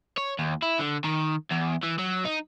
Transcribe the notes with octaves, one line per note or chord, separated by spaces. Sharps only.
C#5
D#2
E4
D3
D#3
E2
E3
F#3
D#4